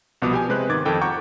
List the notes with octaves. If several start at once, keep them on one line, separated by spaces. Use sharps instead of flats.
C2 B2 F3 B3 D6 D#6
G4 G#5
C3 G#3 B4 C5 F#6
G#2 D#3 D6 G#6 A6
F2 D#3 A4 G5
F#5 G5 A#5 C#6 D6 G6